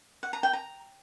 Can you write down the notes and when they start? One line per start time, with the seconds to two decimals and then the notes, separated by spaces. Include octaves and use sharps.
0.23 F#5
0.33 A#5
0.43 G5
0.53 A#5